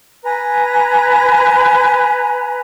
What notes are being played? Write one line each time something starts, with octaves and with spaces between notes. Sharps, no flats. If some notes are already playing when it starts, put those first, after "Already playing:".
B4 G#5 A#5